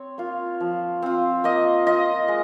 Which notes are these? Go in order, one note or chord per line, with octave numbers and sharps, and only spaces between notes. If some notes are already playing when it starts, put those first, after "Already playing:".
Already playing: C4 C#5
A#3 F4
F3
C4 F4
A#3 D#5
F4 D#5
G#3